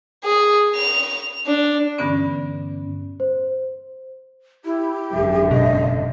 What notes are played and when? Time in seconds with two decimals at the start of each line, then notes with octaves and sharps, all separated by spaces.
0.25 G#4
0.76 F7
1.47 D4
1.98 G2 B2 D3 E3 B3 C#4
3.20 C5
4.65 E4 G4
5.12 G#1 F#2 D3 E5
5.51 B2 D#5